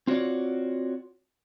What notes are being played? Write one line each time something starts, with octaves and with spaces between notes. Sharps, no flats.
C4 F4 F#4 C#5 D5